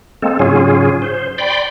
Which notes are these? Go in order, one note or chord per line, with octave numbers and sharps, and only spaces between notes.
G#3 A#3 C4 A4
G#2 C#3 F#3 C#4 F4 G#4
C5
D5 G5 B5 C6